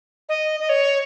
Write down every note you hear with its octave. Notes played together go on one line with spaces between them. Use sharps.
D#5
D#5
C#5